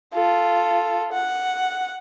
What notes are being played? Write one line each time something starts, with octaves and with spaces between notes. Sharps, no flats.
F4 A4
F#5